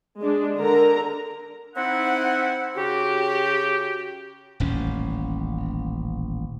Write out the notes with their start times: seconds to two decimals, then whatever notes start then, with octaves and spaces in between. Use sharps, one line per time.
0.21 G#3 D4
0.58 D3 A#4 A#5
1.76 C4 D#4 E4 F#5
2.76 C#3 F#4 G4
4.60 D#1 A1 C#4